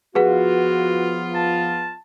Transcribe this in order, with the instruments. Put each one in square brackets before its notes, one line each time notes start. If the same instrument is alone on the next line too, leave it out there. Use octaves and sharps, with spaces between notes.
[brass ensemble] F3 B3 F4 [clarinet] F#4 [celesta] G#4 B4 F#5
[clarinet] A5